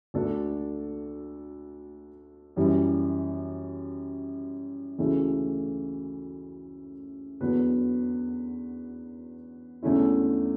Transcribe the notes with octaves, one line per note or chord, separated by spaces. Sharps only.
D2 D3 A3 D4 A4
F#2 E3 G3
D2 C#3 E3 A3
E2 D3 F#3 B3
E2 D3 A3 C#4 E4